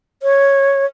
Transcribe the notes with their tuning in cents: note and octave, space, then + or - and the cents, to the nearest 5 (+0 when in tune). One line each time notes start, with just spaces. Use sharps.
C#5 -5